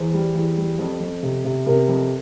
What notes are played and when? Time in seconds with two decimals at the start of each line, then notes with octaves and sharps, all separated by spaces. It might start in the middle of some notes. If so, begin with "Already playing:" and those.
Already playing: E2 C5
0.14 G3
0.35 E2
0.57 G3
0.79 F2
1.00 F2
1.23 C3
1.44 C3
1.66 C3 A#4
1.88 F2